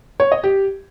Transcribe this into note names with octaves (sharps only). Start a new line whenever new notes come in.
C#5
D#5
G4